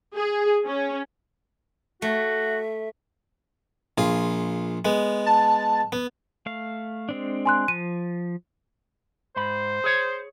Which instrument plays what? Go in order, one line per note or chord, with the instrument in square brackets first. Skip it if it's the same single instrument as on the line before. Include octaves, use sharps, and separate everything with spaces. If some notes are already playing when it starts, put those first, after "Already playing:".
[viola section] G#4
C#4
[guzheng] A3 [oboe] F#4 [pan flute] E5
[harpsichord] A#1 F4 G#4
G#3 B3
[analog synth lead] A5
[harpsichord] B3
[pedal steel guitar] A3 F5
G#3 C4 D4
[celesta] G#5 C6 F#6
[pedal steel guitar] F3 [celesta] D#7
[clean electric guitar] G#2 B5 [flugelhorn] C5
[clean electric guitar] G#4 C#5